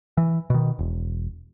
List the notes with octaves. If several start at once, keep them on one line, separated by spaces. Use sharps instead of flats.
E3
B2 D#3
E1